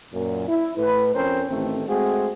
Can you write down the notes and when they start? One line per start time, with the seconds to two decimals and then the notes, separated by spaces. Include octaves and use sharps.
0.13 F#2 A#2
0.48 E4
0.77 A2 B4
1.14 F2 C4 C#4 A#4 C5
1.48 A1 D#3 A3 C4
1.88 G#3 A3 C4 F#4 G#4